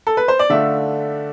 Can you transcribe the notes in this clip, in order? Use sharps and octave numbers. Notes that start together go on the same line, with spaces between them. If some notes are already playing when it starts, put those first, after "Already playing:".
A4
B4
C5
D5
D3 A3 D4 F4 E5